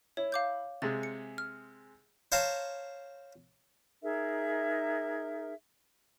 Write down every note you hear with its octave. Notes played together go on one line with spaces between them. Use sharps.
E4 C#5
F5 D6 G6
C3 G#3 G#4 A6
C#7
F6
C5 C#5 F5 A5 A#5
D#4 G#4 A#4 E5